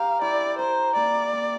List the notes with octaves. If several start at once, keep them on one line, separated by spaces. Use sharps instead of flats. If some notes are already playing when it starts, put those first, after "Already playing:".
Already playing: G4 A#4 F5
E4 D5
A#4 C5
A#3 D5
A#3